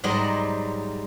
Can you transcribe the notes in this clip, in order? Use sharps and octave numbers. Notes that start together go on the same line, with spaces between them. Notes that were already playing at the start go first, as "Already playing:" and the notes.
G#2 F#3 G3 C5 D5 D#5